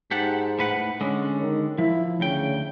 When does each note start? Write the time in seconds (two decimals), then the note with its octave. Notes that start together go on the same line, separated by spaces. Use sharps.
0.11 G#2 G4 A4 F#5
0.59 A2 B4 F#5
1.01 D3 G#3 C#4
1.41 D#3
1.78 F3 E4
2.20 D2 C#3 G5